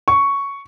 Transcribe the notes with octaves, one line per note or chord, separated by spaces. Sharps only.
C#6